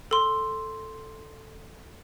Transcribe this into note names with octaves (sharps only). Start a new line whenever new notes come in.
A4 C6